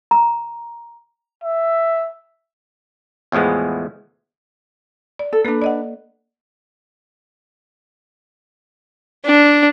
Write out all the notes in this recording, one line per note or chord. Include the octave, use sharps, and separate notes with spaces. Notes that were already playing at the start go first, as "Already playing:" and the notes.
A#5
E5
E2 A2 F3 G#3 B3
D5
A4
A#3 D4 A4 B4
D5 D#5 F#5
D4